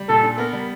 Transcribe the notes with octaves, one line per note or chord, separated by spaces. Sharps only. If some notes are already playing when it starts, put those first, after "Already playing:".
Already playing: G3
A#2 A4
D4
B3 A#4
G3